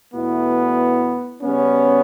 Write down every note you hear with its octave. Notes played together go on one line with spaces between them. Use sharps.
E2 B2 A3 B3 E4
C#3 G3 B3 C#4